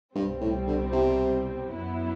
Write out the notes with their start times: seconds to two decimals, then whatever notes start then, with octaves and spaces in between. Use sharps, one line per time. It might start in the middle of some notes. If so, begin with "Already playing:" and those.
0.15 C2 G2 B2 G3 C4
0.41 A2
0.67 D3
0.92 C3
1.70 F#2 F#3 B3 E4